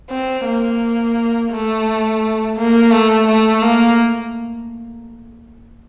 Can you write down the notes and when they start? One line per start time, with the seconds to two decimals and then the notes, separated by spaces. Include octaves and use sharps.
0.10 C4
0.45 A#3
1.51 A3
2.57 A#3
2.91 A3
3.27 A3
3.62 A#3